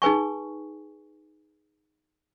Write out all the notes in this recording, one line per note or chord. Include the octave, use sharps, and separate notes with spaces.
D#4 G#4 B4 G#5 C#6